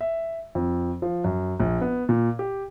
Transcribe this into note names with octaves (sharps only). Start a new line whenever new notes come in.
E5
F2
F3
F#2
A#1
B3
A#2
G4